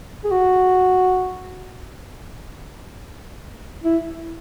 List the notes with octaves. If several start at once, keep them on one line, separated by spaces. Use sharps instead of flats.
G#4
F#4
E4